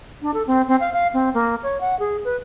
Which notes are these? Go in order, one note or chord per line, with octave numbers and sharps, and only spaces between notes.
D4
A4
C4
C4
F5
F5
C4
A#3
C#5
F#5
G#4
B4